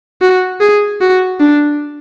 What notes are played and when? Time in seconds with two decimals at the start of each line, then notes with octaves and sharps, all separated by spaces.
0.21 F#4
0.61 G#4
1.01 F#4
1.40 D4